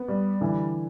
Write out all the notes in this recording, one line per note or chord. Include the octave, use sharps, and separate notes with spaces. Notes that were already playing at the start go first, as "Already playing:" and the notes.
Already playing: B3
G3
D3 E3